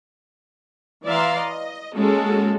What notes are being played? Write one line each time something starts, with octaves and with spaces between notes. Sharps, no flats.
E3 D5 E5 F5 A#5 C6
D#5
G#3 A#3 C#4 F#4 A4